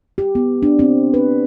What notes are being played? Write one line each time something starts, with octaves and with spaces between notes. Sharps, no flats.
G4
B3
D4
C4
B4